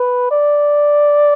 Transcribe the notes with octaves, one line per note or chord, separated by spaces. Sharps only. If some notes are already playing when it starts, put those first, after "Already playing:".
Already playing: B4
D5